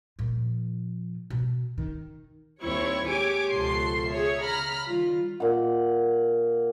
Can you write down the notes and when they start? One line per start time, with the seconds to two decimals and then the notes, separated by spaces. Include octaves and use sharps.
0.19 A#2 F3
1.30 B2
1.78 D#3
2.63 D#2 G3 C4 E4 C#5 C#6
3.08 G#3 G4 C#5 G#5 D6
3.53 C#2 B2 F3 A4 C6 C7
4.10 G#4 C#5 E5
4.45 C#3 A#5 B5 F6 B6
4.86 D#3 G3 F4
5.40 A#2 F#5